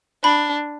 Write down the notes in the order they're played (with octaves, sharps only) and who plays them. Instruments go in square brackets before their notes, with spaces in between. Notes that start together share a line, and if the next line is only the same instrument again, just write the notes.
[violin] D4 [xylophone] B5